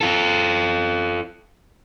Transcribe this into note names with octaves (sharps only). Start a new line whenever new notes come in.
F4 A4